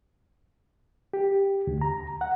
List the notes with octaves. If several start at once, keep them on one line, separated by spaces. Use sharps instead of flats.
G4
D2
A#5
F#5